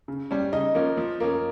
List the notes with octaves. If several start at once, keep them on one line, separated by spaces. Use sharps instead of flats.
C#3
G3 C#4
C#3 D#4 D#5
F3 A#3 C#4
F3
A#3 C#4